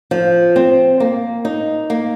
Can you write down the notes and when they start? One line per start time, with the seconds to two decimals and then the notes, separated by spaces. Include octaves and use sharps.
0.11 F3
0.56 C4
1.00 A#3
1.45 D#4
1.90 A#3